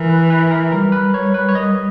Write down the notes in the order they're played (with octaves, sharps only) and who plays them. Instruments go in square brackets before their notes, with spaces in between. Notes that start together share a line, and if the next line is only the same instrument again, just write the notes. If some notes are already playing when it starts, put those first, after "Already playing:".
Already playing: [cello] E3 [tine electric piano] A#4
[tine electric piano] B4
B4
A#4
[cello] G3 [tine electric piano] A#4
[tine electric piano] B4
C#5
B4
C#5
D#5